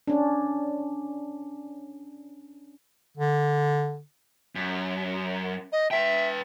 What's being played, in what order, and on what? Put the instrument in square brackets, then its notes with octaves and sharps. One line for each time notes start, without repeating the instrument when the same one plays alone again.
[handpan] C#4 D4
[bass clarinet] D3
[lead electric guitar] F#2
[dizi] D#5
[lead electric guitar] B4 G5 [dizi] E5